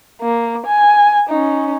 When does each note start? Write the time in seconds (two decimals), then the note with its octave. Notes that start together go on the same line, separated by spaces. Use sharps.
0.22 A#3
0.67 G#5
1.30 C#4 D#4